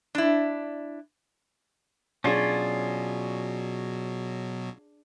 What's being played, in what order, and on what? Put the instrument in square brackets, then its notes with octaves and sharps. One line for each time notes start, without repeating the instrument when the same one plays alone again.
[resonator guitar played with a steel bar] D4 E4
[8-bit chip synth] B2 F#3 [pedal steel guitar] C#4 F4 [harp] D4 G#4